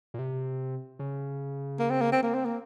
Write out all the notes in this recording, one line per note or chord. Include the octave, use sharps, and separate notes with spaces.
A#2
C3
C#3
A#3
C4
A#3
C4
A#3
C4
A#3